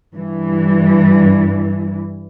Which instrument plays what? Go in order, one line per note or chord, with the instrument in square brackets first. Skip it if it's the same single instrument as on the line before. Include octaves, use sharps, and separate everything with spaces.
[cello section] G2 E3